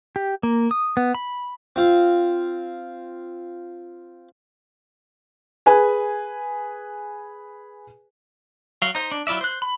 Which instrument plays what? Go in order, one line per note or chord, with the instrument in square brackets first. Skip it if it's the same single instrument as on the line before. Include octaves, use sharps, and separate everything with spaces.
[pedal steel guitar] G4
A#3
D#6
B3
B5
[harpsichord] C4 F4
[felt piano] G#4 B4 G#5
[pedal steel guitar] F#3 F5
D#4 C5
D4
F#3 E4 F4 D5 E5
C5 F#6
B5